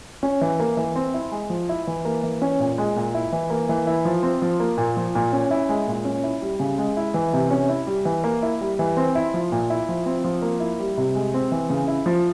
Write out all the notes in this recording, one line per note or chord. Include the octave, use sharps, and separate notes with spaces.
C#4
E3
A#3
E3
C4
E4
G#3
F3
E4
E3
A#3
E3
C#4
A#2
G#3
A#2
E4
E3
A#3
E3
E4
F3
C4
F3
A#3
A#2
F3
A#2
C#4
E4
G#3
A#2
C#4
E4
G3
C#3
G#3
E4
E3
C3
C#4
E4
G3
E3
A#3
E4
G3
E3
C4
E4
F3
A#2
E4
F3
C4
F3
A#3
E4
G3
C3
G#3
C4
E3
C#3
E4
F3